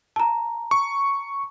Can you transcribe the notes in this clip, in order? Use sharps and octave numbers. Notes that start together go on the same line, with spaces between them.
A5 A#5
C#6